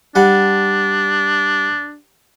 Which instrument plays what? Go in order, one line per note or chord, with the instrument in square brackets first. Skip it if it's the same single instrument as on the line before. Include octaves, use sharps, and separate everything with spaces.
[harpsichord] G3 F#5 A5 [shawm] D4